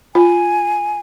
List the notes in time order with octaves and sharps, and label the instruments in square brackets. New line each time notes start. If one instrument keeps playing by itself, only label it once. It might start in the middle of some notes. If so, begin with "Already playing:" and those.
[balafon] F4 [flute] G#5